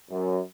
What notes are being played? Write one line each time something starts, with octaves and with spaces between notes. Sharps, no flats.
F#2